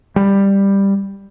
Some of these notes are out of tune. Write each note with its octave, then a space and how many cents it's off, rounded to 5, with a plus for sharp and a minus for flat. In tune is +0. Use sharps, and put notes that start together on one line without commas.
G3 +10